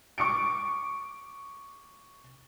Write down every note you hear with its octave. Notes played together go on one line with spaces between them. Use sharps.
C#6 D6 C#7 D7